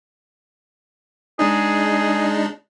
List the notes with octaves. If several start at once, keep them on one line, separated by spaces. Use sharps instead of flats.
G#3 D4 D#4 G#4